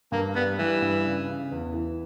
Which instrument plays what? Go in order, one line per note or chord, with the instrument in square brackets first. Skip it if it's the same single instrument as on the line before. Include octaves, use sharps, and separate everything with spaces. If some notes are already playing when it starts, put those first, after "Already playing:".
[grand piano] G2 [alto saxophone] A#3
[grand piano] G3 [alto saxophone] B3
[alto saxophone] E3 [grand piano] G3
[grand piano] G2
C#3
C#3
E2
E3